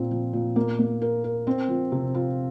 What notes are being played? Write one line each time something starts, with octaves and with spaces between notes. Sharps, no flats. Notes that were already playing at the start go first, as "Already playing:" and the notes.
Already playing: A#2 C4
F3
A#2
A#3
A#3
A#4
A#4
C4
F3
C3
F4